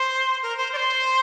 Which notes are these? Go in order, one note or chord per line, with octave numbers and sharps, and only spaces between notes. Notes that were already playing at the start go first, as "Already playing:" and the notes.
Already playing: C5
A#4
C5
D5
C5